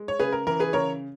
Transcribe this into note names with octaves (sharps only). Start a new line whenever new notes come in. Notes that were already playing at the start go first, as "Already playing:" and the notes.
Already playing: G#3
C#5
C#3 G#4 B4
A#4
E3 A#4
G#4 B4
C#3 A#4 C#5